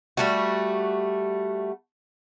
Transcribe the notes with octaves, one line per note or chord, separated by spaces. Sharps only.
G3 A3 F#4